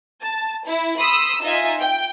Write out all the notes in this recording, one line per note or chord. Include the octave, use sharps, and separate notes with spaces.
A5
E4
B5 C6 D#6 E6
D#4 F4 D#5 E5 G#5
G5